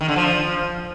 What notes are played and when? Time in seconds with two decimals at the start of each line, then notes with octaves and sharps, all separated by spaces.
0.01 D#3
0.08 D3
0.16 F3